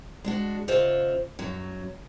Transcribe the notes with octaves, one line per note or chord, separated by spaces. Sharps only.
G#3 D4 F#4
C#3 F4 C5 D#5 E5 F#5
F#2 F#3